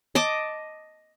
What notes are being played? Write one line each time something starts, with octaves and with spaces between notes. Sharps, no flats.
D#5 A5 D6